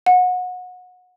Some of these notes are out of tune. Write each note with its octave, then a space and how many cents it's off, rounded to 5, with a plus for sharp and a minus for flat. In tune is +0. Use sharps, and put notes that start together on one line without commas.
F#5 -25